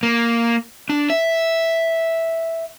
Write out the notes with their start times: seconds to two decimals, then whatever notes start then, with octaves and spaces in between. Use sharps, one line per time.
0.03 A#3
0.89 D4
1.10 E5